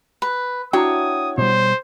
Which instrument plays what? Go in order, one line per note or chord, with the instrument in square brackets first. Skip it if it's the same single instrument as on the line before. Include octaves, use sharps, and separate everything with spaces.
[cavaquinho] B4
[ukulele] D4 E4 F#4 [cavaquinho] C#5 [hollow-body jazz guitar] G5 A#5 [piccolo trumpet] D#6
[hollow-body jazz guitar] B2 G3 [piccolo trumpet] C5